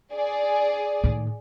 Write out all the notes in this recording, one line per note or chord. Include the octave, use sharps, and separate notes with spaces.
G#4 D5
A2 D#3